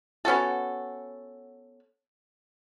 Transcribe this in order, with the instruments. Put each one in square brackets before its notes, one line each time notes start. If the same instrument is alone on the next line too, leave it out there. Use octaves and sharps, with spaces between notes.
[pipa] B3 C#4 F#4 A4